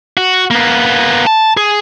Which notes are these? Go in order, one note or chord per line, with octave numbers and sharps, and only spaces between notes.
F#4
A#3 B3
A5
G#4